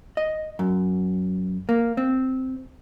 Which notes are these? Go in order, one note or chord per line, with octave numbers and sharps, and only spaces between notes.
D#5
F#2
A#3
C4